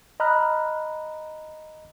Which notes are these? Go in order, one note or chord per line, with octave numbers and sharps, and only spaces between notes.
D#5 A#5 B5 F6 F#6